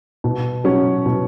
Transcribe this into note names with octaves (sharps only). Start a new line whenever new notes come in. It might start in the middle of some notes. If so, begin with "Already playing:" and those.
B2
F#3 C#4
B2